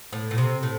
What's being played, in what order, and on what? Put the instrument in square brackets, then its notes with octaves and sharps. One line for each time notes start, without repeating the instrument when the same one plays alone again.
[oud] A2
A2
C3
A2